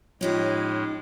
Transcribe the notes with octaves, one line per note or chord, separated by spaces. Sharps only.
A2 F3 G#3 C#4 D#4 G4 C#5